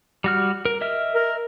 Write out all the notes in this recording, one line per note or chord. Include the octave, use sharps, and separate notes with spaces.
G3 F#4 F6
A#4
D#5 E5 F6
A#4